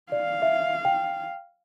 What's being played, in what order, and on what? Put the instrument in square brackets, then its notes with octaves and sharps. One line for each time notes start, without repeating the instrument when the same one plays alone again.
[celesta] D5 [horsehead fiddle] F5
[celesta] E5
G5